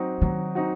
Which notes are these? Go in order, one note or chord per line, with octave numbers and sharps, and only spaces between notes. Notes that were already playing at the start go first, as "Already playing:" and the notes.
Already playing: F#3 C4 D#4 F#4
D#3 F#3
C4 D#4 F#4